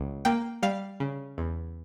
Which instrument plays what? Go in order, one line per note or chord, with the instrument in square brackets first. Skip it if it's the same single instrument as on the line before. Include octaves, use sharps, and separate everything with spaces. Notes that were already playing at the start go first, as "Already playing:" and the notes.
Already playing: [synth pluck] C#2
A#3 G5
G3 F5
C#3
E2